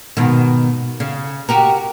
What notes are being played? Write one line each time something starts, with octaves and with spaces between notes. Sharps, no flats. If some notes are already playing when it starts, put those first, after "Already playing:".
G#2 B2 D#3
C#3
F#4 G4 A#4